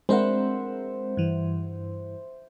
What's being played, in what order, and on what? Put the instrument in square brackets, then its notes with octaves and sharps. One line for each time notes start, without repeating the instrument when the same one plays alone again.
[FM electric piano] G#3 C4 A#4 [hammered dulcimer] C5 E5 F#5
[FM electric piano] G2 E3